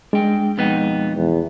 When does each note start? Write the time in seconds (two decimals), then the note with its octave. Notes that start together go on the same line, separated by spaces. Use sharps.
0.13 G#3 D4 G5
0.58 F2 B2 F3 B3 D#4 G5
1.15 E2